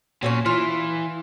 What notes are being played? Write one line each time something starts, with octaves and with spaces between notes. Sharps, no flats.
A#2 F#3 A3 C#4
E3 F4